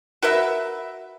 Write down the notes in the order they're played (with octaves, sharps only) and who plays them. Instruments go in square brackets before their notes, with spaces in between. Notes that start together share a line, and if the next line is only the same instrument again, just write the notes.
[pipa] F#4 A#4 B4 E5